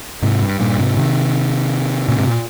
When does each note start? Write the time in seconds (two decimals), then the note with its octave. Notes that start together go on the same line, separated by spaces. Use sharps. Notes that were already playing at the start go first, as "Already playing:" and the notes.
0.22 G#2 C3
0.42 G2
0.60 G2 A#2
0.78 G#2 C3
0.97 C3 D#3
2.09 A#2 C#3
2.18 G#2 C3
2.27 A#2